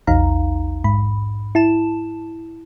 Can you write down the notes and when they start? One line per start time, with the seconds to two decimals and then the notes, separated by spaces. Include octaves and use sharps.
0.07 A#1 E2 D#4 F5 A#5
0.84 G#2 B5
1.55 E4 A5 E7